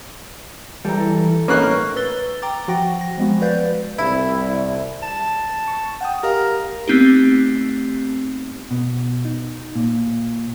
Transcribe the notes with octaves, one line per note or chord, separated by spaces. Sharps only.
E3 G3 A4 A#5
A2 A#3 C#4 D#4 B4 A#5 F#6
B4 E6 A6 G7
G5 A#5 D6 A6
F3 F#4 F#5 G5 A#6
A#6
F3 G#3 B3 F#4
B4 D5 F5 G6 A6
C2 E4
A5
C#6
F#5 G5 D#6
G4 A#4 D#5 F5
A3 B3 C4 D#4 G4
B2
D#4
A#2